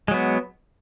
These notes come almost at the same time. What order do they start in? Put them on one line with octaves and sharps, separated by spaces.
G#3 F#3 B3